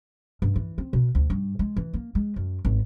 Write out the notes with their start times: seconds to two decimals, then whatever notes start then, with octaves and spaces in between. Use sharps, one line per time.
0.42 G2
0.56 E3
0.78 C4
0.93 B2
1.15 D2
1.30 G2
1.59 G#3
1.77 E3
1.94 A#3
2.15 G#3
2.36 F#2
2.65 G#1